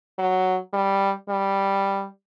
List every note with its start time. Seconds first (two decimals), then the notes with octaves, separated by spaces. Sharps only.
0.19 F#3
0.74 G3
1.29 G3